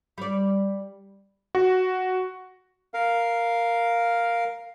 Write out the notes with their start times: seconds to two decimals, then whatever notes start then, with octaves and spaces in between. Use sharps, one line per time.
0.18 G3 D5
1.55 F#4
2.94 A#4 F5